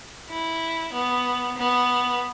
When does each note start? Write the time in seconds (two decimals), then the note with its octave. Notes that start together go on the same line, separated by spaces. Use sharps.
0.30 E4
0.93 B3
1.58 B3